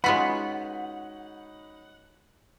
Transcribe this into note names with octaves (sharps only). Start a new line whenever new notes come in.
G#3 C#4 D#4 F4 F#4 B4 F#5 B5